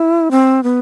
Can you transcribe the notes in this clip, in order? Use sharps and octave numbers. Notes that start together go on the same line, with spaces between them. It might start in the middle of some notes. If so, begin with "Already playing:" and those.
Already playing: E4
C4
B3